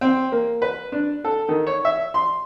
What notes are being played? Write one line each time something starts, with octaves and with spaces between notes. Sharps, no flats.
C4
A#3
B4
D4
A4
D#3
C#5
E5
C6